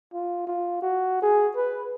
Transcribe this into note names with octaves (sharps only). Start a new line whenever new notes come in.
F4
F4
F#4
G#4
B4